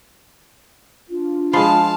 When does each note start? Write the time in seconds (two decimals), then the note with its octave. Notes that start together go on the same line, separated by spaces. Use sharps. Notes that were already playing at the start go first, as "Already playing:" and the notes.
1.09 D4 F4
1.53 F3 G#3 F5 A5 B5 C6 C7